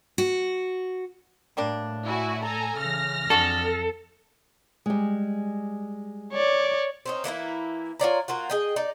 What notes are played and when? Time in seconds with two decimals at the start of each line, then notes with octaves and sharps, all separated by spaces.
0.18 F#4
1.57 A2 G3 A#3 D4
2.04 E4 F#4 G#5
2.44 A4 G#5 A#5
2.77 C#3 E3 F6 A#6
3.30 F2 D4 F#4 G#4 A4
4.86 G3 G#3
6.33 C#5 D5
7.06 C4 C#4 D#4
7.24 E3 A#3 D#4 E4
7.99 F4 C#5 D5 A#5
8.28 A#3 F4 F#4
8.50 G#4 D#5 G5
8.76 D#4 D5